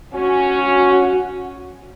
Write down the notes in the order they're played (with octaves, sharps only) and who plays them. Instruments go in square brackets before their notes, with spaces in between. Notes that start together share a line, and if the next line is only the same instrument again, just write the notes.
[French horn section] C#4 [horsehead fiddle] F#4
[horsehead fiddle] F#4